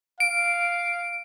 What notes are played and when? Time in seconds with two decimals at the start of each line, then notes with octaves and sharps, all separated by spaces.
0.20 F5 D7